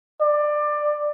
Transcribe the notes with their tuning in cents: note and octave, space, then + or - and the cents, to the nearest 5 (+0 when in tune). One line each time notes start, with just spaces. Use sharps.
D5 +20